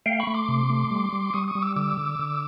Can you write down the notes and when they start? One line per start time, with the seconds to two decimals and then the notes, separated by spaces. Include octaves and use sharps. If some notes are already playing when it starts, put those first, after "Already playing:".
0.06 A3 F5 G5
0.20 B5 C#6
0.27 A3
0.34 C6 D6
0.48 C3
0.70 A3
0.91 G3
1.13 G3
1.33 G3 C#6 D#6
1.48 C#6 D#6
1.55 G3
1.62 D6 E6
1.76 D3 D6 E6
1.97 D3
2.19 D3